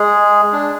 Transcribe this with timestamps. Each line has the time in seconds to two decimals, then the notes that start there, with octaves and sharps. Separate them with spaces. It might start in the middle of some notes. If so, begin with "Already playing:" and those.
Already playing: G#3 G#4
0.53 D4